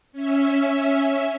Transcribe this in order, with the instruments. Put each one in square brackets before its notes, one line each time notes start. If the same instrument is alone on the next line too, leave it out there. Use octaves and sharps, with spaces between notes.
[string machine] C#4 E5